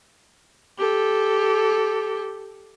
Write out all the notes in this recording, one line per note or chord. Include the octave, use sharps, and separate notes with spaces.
G4 A4